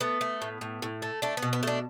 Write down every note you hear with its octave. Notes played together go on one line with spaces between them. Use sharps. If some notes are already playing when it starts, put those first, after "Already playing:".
A3 B3
A3
A2
A2
A2
A3
A3 D4
B3
B2
B3
A3 D4